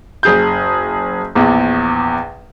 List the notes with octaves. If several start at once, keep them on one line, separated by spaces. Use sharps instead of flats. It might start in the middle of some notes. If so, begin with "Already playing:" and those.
F#1 G#4 G6
A#1 E2